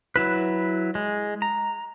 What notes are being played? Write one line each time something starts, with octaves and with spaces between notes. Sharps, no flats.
F#3 E4 B4
G#3
A#5